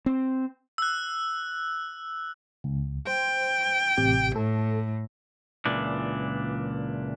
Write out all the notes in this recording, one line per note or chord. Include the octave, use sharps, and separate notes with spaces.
C4
E6 F#6
C#2
C5 G5
A1 C3 G4
A2 A4
C#2 A#2 E3 D4